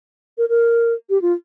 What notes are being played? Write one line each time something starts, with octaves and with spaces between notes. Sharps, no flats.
A#4
A#4
G4
F4